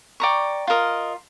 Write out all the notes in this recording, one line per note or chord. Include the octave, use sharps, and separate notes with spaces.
D5 G5 A#5 C#6
F4 A#4 D#5